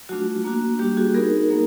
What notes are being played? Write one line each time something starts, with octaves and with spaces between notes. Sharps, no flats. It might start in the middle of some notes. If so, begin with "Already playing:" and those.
F#3 A3 D4 F4 F#4
A#3 D4 F#4
G3 A#3 D4 F#4 G4
F#4 G#4
B3 D#4 F#4 G#4 A#4
F#3 A#3 D#4